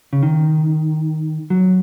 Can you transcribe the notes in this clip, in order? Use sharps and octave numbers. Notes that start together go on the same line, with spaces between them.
C#3
D#3
F#3